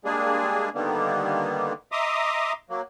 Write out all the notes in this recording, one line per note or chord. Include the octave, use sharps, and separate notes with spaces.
G3 G#3 A#3 D4 G#4
D3 D#3 G3 A#3 B3
D#5 E5 A#5 C6 D6 D#6
F#3 A#3